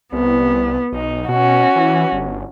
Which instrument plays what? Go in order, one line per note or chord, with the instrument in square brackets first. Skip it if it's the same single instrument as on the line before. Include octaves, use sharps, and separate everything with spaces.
[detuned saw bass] C2 [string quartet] B3
[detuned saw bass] B1 [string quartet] D#4
[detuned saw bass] B2 [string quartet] C#4 F#4
[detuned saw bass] E3
G1